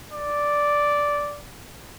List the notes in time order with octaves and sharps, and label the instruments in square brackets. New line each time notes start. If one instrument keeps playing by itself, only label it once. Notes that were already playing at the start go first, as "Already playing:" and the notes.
[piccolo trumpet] D5